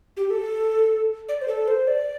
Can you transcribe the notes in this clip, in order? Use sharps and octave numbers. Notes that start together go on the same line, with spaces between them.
G4
A4
D5
C5
A4
C5
D5